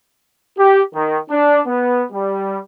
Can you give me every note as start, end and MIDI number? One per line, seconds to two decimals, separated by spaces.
0.58 0.81 67
0.94 1.17 51
1.31 1.60 62
1.67 2.04 59
2.12 2.58 55